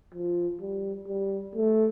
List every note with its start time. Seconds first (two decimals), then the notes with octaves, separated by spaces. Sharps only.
0.14 F3
0.60 G3
1.07 G3
1.55 A3